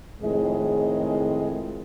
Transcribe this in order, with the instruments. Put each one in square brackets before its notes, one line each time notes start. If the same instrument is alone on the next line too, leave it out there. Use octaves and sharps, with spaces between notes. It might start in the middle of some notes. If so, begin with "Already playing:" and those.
[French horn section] F2 A2 D#3 G#3 G#4 D#5